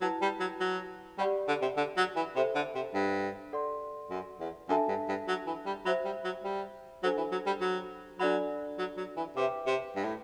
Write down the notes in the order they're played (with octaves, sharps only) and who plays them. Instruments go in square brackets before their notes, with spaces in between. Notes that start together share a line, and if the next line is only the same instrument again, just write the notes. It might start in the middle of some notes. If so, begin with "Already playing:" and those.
[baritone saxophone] F#3 [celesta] E4 B4 F#5 A5
[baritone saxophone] G3
F#3
F#3
[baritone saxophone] G3 [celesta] G4 D5 F#5 B5
[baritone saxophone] D3
C3
D3
F#3
E3
[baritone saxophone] C3 [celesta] A4 C5 E5 B5
[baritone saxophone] D3
C3
G2
[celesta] A4 D5 F#5 C6
[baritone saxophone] F#2
E2
[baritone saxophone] F#2 [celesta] D4 A4 E5 A5
[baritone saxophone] G2
G2
F#3
E3
G3
[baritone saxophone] F#3 [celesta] C5 E5 B5
[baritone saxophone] G3
F#3
G3
[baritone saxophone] F#3 [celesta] D4 A4 C5 F#5
[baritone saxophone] E3
F#3
G3
F#3
[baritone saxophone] F#3 [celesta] D4 A4 D5 F#5 B5
[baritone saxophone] F#3
F#3
E3
[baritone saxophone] C3 [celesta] B4 E5 G5 D6
[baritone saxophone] C3
G2
A2